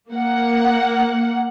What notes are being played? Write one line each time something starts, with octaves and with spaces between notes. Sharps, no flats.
A#3 F#5